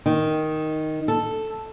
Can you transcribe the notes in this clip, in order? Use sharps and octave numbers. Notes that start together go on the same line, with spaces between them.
D#3
A4